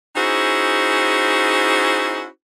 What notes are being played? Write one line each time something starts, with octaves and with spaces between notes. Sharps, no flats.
C#4 D#4 E4 F#4 G#4 C5